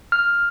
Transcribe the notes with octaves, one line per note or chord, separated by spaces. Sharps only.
F6